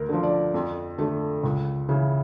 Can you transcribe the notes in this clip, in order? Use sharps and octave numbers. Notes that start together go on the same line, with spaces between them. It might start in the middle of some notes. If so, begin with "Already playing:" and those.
Already playing: D2 A#4
D3 F3
D5
F2
D3 A3
C#2
C#3 E3